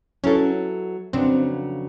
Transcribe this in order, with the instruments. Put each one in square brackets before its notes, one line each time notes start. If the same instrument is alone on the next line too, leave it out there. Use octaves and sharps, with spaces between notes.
[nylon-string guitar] F#3 B3 E4 A4 [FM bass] C#4
[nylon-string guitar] F2 C#3 F#3 B3 D4 [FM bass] C4